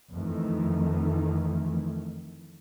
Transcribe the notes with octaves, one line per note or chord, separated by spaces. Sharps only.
F2 D#3 E3 A3